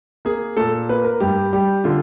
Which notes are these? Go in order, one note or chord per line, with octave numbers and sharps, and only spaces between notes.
A#3 G#4
A#2 A4
A#3 B4
A#4
G2 G4
G3 G4
D3 F4